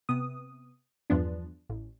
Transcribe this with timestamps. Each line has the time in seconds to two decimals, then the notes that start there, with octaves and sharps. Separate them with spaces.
0.09 C3 B3 D#6
1.10 E2 G2 F3 B3 D4
1.69 A1